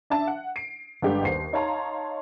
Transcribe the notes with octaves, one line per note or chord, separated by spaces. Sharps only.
D4 E5 A5
F#5
C7 D7
G1 D3 G#3 D4 G4 F#5
D#2 C5 C7
D#4 C#5 F5 A5 A#5 C6